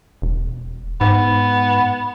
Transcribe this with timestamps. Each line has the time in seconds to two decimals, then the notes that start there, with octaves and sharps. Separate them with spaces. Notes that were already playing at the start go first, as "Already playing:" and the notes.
0.22 E1
1.01 G#2 B3